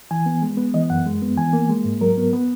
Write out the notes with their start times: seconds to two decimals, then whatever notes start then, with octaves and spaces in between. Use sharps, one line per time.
0.11 E3 G#5
0.26 B3
0.42 G#3
0.57 B3
0.74 E3 D#5
0.90 F#2 F#5
1.06 G#3
1.22 B3
1.37 E3 G#5
1.53 A#3
1.69 G#3
1.84 G#2
2.01 F#3 A#4
2.17 B3
2.33 B3